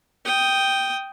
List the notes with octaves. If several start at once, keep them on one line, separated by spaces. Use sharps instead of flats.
G5 D#6